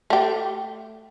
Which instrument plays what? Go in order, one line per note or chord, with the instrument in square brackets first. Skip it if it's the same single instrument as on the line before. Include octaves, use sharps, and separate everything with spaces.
[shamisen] A3 G4